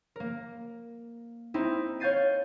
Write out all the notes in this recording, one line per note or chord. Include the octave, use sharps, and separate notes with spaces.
A#3 A#4
C4 D#4 E4
C#5 F5 G6 A6 C7 D#7